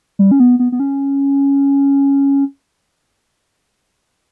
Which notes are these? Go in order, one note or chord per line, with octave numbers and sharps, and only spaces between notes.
G3
C#4
B3
B3
B3
C#4